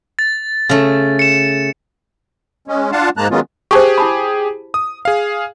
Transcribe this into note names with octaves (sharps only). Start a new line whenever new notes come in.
A6
C#3 A3
C#7 E7
G#3 C#4
D4 F4 F5 F#5 A5
G#2 G#3 A#3 A5 A#5 F#6
D#3 F#3 G#3 B3 C#4 F4
G4 G#4 C5 A5 C#6
E4 A5 B5
D#6
G#4 F5